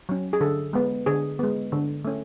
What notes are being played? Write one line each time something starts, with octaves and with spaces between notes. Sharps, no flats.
F#3 C#4
G#4
D3 A4
G#3 B3
D3 G#4
G#3 B3
D3
A3 C#4